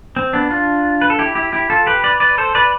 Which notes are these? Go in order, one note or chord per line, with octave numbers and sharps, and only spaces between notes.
C4
B3 D4
D4 F4
B4
A4
E4 G4
E4 G4
E4 G4
F4 A4
G4 B4
B4 D5
B4 D5
A4 C5
B4 D5